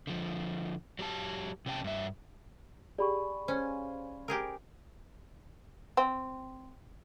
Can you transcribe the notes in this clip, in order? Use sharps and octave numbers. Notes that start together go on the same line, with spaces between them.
D3 F3
F#3 G4 A5
C3 C#4 G5 A5
G2 E5
G4 G#4 D5 B5 C#6
C#4 C5 F5 G#5
G4 G#4 A#4
C4